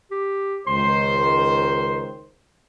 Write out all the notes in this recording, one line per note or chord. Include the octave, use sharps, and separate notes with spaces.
G4
C#2 D#3 C5 C6